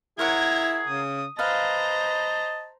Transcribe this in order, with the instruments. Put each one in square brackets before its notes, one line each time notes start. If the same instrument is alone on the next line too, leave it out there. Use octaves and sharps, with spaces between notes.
[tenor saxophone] E4 [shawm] G#4 [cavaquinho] A#4 C#5 F#5 [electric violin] A#5 G#6
[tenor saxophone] C#3 [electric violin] D#6
[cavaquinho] B4 F5 [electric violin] C5 A#5 [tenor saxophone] D#5 [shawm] A5